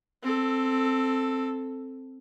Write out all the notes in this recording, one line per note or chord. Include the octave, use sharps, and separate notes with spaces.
C4 A4